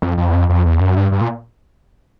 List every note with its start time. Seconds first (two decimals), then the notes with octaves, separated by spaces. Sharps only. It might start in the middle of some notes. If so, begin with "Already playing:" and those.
0.02 F2
0.18 F2
0.29 E2
0.33 F2
0.50 F2
0.65 E2
0.80 F#2
0.97 G2
1.12 G2
1.21 A#2